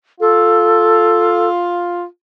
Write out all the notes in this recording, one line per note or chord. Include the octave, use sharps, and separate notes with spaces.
F4 A4